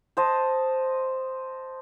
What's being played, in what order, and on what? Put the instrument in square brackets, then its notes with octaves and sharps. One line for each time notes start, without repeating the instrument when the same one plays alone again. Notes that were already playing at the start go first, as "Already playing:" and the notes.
[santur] C5 D#5 A5